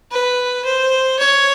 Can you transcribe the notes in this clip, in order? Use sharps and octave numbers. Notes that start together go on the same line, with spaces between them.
B4
C5
C#5